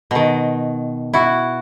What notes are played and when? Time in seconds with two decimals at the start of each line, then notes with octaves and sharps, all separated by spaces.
0.11 B2 D#3
1.13 E4 F#4